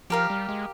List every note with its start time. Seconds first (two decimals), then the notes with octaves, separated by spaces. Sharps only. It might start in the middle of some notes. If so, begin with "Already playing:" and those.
0.10 F3 G4 A#4 F5
0.30 G3
0.49 G#3